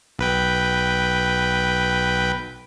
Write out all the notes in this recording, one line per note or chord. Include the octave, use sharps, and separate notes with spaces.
B1 B4 G5